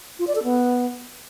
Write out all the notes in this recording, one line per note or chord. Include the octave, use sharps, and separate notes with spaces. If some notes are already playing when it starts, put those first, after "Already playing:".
F4
D5
A4
B3